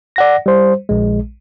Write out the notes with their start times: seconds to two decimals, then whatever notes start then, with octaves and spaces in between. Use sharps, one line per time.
0.16 D5 F#5 A#6
0.46 G3 C5
0.89 A#1 G#3